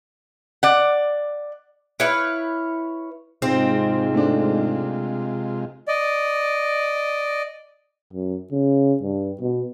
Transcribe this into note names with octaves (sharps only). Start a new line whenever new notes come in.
D5 F#5
E4 B4 C#5 F5
G#2 C3 G#3 C4 F4
A3 D4
D5 D#5
F#2
C#3
G2
B2